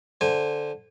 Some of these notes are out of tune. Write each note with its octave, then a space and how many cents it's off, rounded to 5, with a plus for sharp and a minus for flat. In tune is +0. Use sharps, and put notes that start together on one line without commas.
D3 +0 C5 +0 G#5 -25